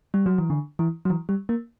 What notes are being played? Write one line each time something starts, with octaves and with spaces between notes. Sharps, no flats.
G3
F#3
E3
D3
E3
F#3
E3
G3
A#3